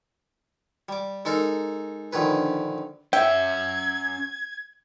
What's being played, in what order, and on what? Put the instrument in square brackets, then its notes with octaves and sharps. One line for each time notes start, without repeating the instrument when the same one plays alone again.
[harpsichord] G3 D6
G#3 D#4 A4 A#4
A#1 D3 D#3 G#4 B4
[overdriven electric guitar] C#4 F#4 [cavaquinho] E5 [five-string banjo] G5 [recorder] G#6